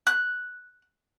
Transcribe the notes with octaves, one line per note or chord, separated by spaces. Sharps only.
F#6